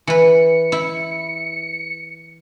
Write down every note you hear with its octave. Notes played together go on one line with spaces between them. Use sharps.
E3 B4 C#7
E4